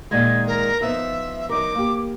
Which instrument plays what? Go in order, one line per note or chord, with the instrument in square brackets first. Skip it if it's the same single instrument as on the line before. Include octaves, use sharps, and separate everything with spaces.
[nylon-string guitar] A#2 D#3 G#3 [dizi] G#6
[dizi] A#4
[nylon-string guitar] F3 B3 D#4 [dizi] E5
[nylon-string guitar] F#3 D#4 A#4 [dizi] D6
[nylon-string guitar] A#3 G4